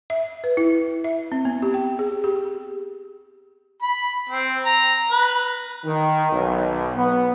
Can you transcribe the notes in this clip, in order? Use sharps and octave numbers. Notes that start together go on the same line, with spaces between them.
E5
B4
E4
E5
C4
B3
G4
G5
G#4
G4
B5
C4
A#5
B4
D#3
B1
B3